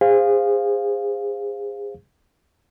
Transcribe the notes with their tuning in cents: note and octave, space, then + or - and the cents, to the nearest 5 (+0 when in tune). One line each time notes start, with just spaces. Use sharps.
G#4 -30 C5 +0 F5 +0